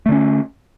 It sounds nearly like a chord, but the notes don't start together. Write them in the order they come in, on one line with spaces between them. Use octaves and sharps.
A3 D3 C#4